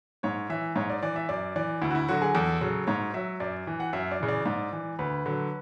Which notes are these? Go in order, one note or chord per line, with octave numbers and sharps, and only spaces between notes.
G#2 C#5
E3 E5
G#2 C#5
D5
E3 D5
E5
F#2 D5
E3 D5
D2 E4
F#4
E4
D3 F#3 F#4
G#4
E2 A4
C#3 F#3
G#2 C#5
F#3 E5
F#2 D5
E3
F#5
F#2 E5
D5
C#3 E3
D5
G#2
E3
D2 B4
D3 F#3